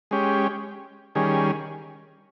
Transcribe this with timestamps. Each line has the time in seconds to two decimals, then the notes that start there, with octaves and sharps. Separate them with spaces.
0.11 G#3 C#4 G4
1.15 D#3 G3 C#4 G#4